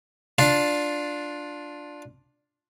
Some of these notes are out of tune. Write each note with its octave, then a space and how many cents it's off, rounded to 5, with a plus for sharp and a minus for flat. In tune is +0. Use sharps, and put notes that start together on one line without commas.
D4 +0 F4 +10